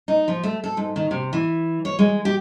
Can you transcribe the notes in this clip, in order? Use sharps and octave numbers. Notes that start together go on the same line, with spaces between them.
D#4
F3
A3
A4
G#2
D#3
C3
E3
C#5
G#3
G4